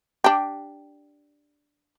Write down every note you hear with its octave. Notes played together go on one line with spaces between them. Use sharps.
D4 G4